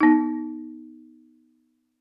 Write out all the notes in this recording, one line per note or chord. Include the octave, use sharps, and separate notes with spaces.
B3 D#4